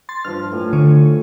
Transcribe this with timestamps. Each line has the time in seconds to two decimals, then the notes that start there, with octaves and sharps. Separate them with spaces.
0.09 C6 A6
0.25 G2 F3 F6
0.51 A2 G#5
0.73 D3 C#5